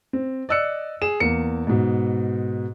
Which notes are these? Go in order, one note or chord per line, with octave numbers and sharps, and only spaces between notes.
C4
D5 D#5 E6 F#6 C#7
G#4 E7
E2 A#3 C#7
G#2 B2